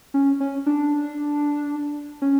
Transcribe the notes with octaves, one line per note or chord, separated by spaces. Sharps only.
C#4
C#4
D4
C#4